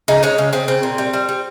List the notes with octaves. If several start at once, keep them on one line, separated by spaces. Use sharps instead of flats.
C#3 D#4
G#3 C#4
C#3 C#4
C#3 C4
C#3 C4
A#2
G3
G3
G3